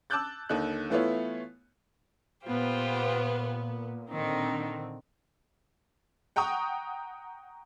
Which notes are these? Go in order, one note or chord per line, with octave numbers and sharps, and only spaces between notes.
A5 D6 E6 F#6 G6 A6
D#2 D3 D#4 F#6
E3 A3 B3 E4 F4 C#5
A#2 B3 F4 G4 C5
D3 D#3 C4 D#4
F#5 G5 A#5 C#6 D#6